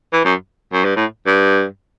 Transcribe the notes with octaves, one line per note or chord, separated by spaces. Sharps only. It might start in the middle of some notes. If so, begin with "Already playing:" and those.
E3
F#2
F#2
G2
A2
G2